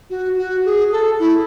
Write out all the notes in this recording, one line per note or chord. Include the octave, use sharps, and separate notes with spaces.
F#4
F#4
G#4
A4
E4